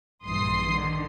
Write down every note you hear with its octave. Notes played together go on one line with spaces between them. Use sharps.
A#1 G2 E3 C6 D#6 C7
D3 D#3